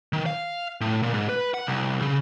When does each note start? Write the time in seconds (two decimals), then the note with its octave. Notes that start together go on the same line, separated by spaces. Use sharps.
0.13 D#3
0.26 F5
0.81 A2
1.03 A#2
1.14 G#2
1.29 B4
1.54 F#5
1.67 C2
2.02 C#3